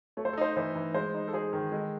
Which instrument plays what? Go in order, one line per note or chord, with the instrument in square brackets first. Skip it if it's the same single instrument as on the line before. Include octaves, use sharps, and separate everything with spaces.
[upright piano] A3 [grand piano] C#5
[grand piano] C5
A4
[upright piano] D#4 [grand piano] C5
[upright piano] E3 [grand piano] C5
[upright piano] E3
[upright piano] G#3 [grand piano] C5
[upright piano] D#4
[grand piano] A4
[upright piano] G#4 [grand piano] C5
[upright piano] D#3
[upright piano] G#3 [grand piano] A4